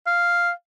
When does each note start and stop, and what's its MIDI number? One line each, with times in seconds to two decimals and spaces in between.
0.07 0.50 77